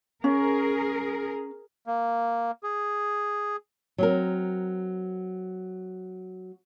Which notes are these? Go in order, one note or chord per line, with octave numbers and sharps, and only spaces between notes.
C#4 G#4 A#4
A#3
G#4
F#3 C4 A#4